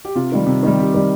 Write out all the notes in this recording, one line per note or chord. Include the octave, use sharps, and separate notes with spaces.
G4
C3 F4
D#3 G3
C3
D#3 G3
C3 G4
D#3 G3